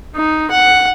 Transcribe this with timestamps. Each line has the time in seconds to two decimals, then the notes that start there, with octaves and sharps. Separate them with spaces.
0.16 D#4
0.51 F#5